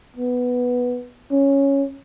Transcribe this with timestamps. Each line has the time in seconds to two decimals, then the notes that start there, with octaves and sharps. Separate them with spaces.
0.17 B3
1.31 C#4